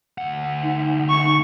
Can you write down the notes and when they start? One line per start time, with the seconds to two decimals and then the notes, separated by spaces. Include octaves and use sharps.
0.18 D2 F#5
0.63 D#4
1.10 C#6